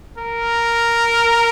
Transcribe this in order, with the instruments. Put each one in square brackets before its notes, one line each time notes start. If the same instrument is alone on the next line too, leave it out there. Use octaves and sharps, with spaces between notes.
[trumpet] A#4